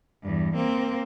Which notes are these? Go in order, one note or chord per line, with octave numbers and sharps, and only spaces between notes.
E2 G2
A#3 C4